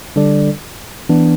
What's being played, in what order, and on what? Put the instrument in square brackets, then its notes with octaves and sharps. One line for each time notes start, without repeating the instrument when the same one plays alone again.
[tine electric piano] D3 G3 D4 A4 D5
E3 B3 D4